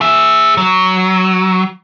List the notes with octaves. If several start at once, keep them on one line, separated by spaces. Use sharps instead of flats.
G#4 E5
F#3